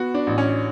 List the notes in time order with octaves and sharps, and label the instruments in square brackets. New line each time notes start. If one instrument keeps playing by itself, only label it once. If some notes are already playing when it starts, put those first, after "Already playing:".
Already playing: [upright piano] B3 [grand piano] F#4
[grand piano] D4
[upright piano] A1
[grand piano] C#4